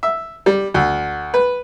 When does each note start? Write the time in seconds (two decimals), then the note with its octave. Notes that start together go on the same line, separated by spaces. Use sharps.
0.03 E5
0.46 G3
0.74 D2
1.34 B4